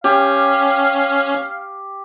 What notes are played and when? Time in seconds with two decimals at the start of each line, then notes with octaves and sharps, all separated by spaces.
0.04 C#4 G4 F5